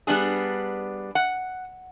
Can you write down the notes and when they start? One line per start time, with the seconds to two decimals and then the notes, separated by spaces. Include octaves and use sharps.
0.07 G3 B3 D4 G#4
1.15 F#5